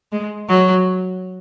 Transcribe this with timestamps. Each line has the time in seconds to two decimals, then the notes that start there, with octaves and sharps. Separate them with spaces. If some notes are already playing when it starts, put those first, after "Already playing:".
0.12 G#3
0.49 F#3